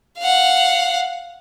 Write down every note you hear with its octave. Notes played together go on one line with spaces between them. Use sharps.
F5 F#5